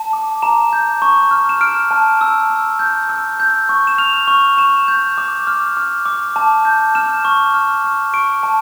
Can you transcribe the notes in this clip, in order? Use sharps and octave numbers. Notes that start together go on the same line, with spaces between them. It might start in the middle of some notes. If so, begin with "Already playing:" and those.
Already playing: A5
D6
A#5 E7
G6
C#6
F6
E7
F6 D7
A5
E6
E6
G6
E6
G6
C#6
E7
F6 F7
C#6
C#6 E7
G6
D6
F6
D6
D6
A5
G6
F6 E7
C#6
F6
C#6
C#6 D7
A5